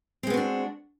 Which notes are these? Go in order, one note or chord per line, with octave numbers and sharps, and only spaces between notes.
G#3 B3 C4 D4 F#4